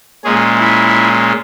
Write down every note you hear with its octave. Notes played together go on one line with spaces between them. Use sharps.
A#2 G#3 C#4 G#4
E4